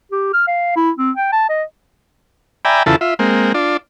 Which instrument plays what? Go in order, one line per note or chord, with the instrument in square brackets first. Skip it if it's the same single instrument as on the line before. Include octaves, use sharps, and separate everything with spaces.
[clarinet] G4
F6
F5
E4
C4
G5
A5
D#5
[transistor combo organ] D5 E5 G5 G#5 A#5 B5
E2 C#3 E4 F4 A4 A5
F4 E5
G#3 A#3 C4
D4 F4 D5